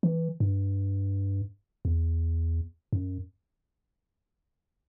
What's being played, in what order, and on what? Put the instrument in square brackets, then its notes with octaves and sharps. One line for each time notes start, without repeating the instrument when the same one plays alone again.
[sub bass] E3
G2
E2
F#2